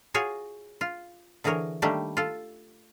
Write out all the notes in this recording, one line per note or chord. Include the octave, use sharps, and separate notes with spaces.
F4 F#4 G#4 C#5 G#5
F4
D3 E3 G#4 A#4 C#5
D#3 G3 A3 A#3 D4 G4
F4 A4